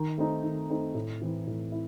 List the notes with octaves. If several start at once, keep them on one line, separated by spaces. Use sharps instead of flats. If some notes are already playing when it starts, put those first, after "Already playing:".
Already playing: D#3
A3 C4 D#4
D#3
A3 C4 D#4
A2
E3 C4 E4
A2
E4